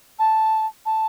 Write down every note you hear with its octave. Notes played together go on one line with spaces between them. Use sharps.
A5
A5